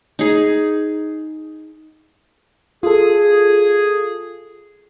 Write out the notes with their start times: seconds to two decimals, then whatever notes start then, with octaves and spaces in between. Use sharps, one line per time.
0.19 D#4 G#4
2.83 F4 G#4 A4